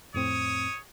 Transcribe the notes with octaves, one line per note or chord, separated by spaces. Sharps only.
F2 A2 C4 C#5 D#6